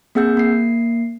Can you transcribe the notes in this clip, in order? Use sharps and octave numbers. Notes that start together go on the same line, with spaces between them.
A#3 C4 G#4 F#5 E6 G6
A#3 C7